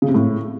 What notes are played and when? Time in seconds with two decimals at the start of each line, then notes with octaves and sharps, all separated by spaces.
0.02 C#3
0.08 C3
0.14 A2